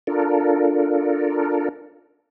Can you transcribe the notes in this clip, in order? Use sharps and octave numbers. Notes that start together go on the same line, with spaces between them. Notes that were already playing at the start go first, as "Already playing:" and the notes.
D4 F4 A4 A#4